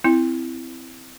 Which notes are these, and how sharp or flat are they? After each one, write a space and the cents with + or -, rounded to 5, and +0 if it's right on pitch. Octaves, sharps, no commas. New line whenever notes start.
C4 -15 E4 +0